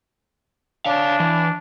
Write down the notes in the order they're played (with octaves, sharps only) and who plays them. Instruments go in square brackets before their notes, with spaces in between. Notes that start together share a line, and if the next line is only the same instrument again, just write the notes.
[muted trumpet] D4 [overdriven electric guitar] C#5 F5
[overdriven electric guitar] E3